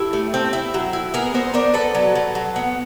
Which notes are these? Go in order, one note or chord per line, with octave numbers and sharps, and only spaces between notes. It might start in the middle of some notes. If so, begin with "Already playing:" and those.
Already playing: E4 G4 A4
A3
C4
E4
F#3
E4
B3 G#4 A#4
B3 A#4 C5
D4 A#4 C5
B3 A4 B4
F#3
F#3
F#3
B3